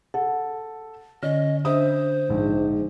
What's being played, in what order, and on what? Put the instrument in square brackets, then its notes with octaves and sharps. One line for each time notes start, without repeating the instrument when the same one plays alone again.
[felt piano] A4 [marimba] F#5
[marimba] D3 [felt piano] C#4 [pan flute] D#5
[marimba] D4 [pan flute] C5 [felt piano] E5 D#6
[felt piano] A#1 [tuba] G#2